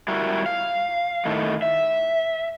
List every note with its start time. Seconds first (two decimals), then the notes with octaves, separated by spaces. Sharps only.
0.08 G3 E4 F#4 A#4
0.46 F5
1.25 A2 D#3 A3
1.62 E5